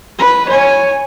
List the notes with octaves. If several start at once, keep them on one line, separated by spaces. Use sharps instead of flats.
B4
C#5 G#5